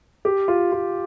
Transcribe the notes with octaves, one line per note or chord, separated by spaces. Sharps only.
G4
F4
F4